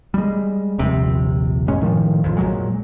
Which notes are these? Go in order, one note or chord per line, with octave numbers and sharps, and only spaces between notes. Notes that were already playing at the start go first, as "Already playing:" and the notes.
G3 G#3
D#1 A#1 C3
F#2 G#3 C#4
A2 D#3 F3
A#1 F2
A#2 F#3 G#3